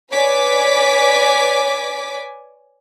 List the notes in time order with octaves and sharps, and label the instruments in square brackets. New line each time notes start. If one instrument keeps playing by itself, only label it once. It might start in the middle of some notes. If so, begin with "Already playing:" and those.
[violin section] B4 C#5 D5 G#5 D6 B6